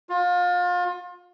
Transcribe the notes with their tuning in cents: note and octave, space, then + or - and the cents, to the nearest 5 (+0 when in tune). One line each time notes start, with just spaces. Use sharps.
F4 +30